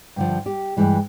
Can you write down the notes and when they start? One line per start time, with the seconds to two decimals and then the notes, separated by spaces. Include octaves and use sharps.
0.16 G2 D3 F3
0.46 G4
0.77 G2 E3 G#3